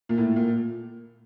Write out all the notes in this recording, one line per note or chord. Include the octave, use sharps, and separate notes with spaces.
A#2
A2
A#2